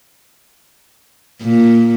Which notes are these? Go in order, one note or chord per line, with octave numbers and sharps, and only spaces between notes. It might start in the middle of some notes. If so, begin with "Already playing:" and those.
A#2